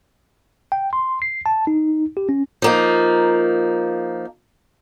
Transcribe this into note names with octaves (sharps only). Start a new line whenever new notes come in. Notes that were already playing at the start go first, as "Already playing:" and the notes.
G5
C6
C7
A5
D#4
G4
C#4
F3 A#3 D#4